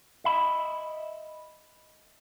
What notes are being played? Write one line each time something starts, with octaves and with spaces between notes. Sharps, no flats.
D#5 E5 B5